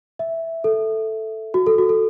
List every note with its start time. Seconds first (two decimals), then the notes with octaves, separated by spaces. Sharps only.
0.19 E5
0.64 A4
1.54 F#4
1.66 A4
1.78 F#4
1.89 A4